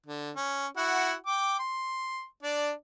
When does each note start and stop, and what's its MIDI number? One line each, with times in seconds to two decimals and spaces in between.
0.06 0.31 50
0.36 0.67 61
0.77 1.14 64
0.77 1.14 66
0.77 1.14 78
1.26 1.58 79
1.26 1.58 86
1.59 2.25 84
2.43 2.72 62
2.43 2.72 74